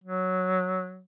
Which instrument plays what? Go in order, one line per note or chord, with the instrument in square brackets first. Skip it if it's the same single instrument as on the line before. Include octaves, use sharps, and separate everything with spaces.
[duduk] F#3